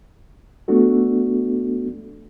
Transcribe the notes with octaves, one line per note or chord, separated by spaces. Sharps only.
A3 B3 D4 F#4 A4